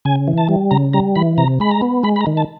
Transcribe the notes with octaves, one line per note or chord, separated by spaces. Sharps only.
C#3 G#5
E3
A5
G3
C#3 A#5
G3 A#5
E3 B5
C3 A#5
G#3 B5
A#5
B3
G#3 B5
B5
A#5
D#3
A5